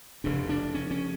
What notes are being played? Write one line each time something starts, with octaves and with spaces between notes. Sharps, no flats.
F1 F2 C#3 D4
D4
C#4
C#4